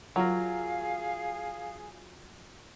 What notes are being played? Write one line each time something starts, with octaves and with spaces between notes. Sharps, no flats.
F#3 F4 G#4 A#4 F5